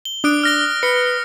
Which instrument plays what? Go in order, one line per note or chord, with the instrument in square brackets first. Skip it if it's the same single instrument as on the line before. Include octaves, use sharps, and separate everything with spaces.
[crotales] G7
[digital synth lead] D4 [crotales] D#6 F#6 D7
[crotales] F6 A#6 G7
[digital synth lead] B4 [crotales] C#7